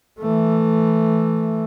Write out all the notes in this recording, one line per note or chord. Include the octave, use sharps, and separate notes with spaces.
E3 A3